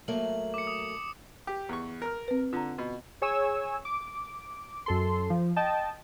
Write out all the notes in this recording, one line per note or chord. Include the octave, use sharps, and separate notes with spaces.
F#3 A3 A#3 F#7
D6 C#7
D#6
G4
E2 C#6
A#4 F6
C4 B4
D3 F4 A#5
B2
G#4 C#5 G#5 E6
D6
F#2 A4 C6
F3
D#5 G5 A5